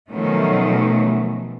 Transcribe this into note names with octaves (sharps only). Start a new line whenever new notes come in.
B2 D#3 F3 F#3 A3 C#4